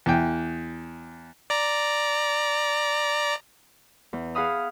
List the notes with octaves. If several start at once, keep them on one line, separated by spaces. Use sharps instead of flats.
E2 G5
D5 A#5
E2
G#4 F5 F#5 B5 D#6 F6